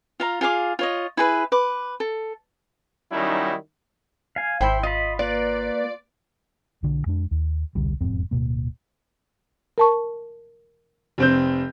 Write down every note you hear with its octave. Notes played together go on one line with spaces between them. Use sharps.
F4 F5 A#5
F4 G#4 F5 D6
F4 C#5 D#5
E4 G#4 B4
B4 D6
A4
D#3 F#3 G3 C#4 D#4 E4
F5 G#5
G#1 E4 C5 G5 B5 C6
F4 D#5 B5
A#3 F4 B4 D5
B1 D3
F2 G#3 D4
D#2
E1 C2 D3 G3
E1 F2 G#2 C4
D1 E2 B2 A#3
A#4 A5 C#6
F1 C4 G6